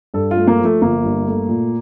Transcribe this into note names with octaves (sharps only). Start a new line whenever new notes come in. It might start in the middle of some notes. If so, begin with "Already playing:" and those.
G2 A4
F4
A3
A#3
F3
A3
G1 A#3
G2
A3
A#2